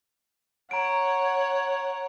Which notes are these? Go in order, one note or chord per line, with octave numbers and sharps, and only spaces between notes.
C#5 F#5 A#5 D7